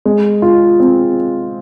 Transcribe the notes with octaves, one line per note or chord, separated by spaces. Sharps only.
G#3
F4
C4